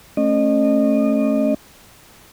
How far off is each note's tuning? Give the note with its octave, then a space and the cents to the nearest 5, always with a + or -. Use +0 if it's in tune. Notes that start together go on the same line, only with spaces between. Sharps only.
A3 +0 C#4 -20 D#5 -30